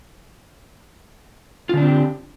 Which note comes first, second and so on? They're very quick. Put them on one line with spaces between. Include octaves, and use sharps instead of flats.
F4 D3 D4 C4 G4